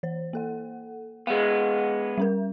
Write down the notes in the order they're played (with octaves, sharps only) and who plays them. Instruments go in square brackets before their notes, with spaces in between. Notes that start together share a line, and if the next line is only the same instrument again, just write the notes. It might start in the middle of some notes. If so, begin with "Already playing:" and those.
[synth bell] E3 C5
A#3 A4 F#5
[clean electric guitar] G#3 B3 [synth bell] F5 F#5
[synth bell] G3 C#4 A#4